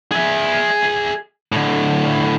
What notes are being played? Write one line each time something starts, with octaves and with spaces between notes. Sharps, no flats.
G#4 E5
A2 D3